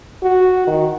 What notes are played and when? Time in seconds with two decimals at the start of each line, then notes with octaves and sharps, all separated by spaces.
0.23 F#4
0.67 D#3